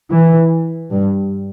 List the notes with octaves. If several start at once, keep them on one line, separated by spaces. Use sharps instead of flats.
E3
G2